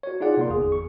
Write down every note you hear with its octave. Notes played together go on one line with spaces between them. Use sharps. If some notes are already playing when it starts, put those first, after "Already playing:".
F#4 C#5
D#4 F4 G#4 D5 F#5
C3 A#3 C6
G1 E2 G#4 D#6
C#6